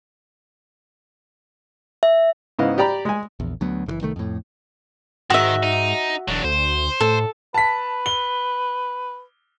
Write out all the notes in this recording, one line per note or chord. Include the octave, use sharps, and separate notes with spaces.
E5
G#2 C#3 B3 E4 D#5 F5
G4 D5 G5 A#5 B5
G#3 G#5
A#1 E2
D2 F#3 B3
F#1 C#3 E3
C2 D#3 A3
F2 A2
G#2 D#3 F#4 E5
D#4
E1 F#3 D4
D2 C5
A2 A4
B4 A5 B6
G7